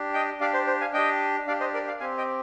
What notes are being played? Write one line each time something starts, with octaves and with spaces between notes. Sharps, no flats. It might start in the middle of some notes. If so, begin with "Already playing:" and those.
Already playing: D4 G4
D#5 G5
D4 G4 D5 F5
C5
C5
F5 G#5
D4 G4 D#5 G5
D4 G4 D5 F5
C5 D#5
A#4 D5
D5 F5
C4 G4 F5 G#5
D#5 G5